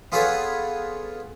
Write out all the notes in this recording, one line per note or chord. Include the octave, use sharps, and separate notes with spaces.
B3 F4 G#4 A4 B4 C#5